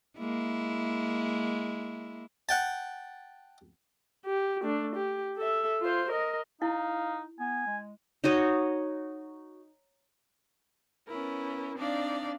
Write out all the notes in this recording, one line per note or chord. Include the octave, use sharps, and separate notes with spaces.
G#3 A#3 E4
F#5 G5 A5
G4
A3 D4
G4
A4 E5
F4 C5
A#4 D#5
D#4 E4 F5
B3 G#5
G#3
D#4 F#4 C#5 D#5
B3 C#4 E4 A#4
C4 D4 D#4 D5 F5